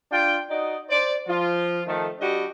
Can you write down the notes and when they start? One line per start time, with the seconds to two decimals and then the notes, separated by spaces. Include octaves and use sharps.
0.11 D4 F4 G5
0.49 D#4 F#4 D5 D#5
0.89 C5 D5
1.27 F3 F4
1.86 D#3 F3 A3
2.20 G3 D4 F#4 G4 D#5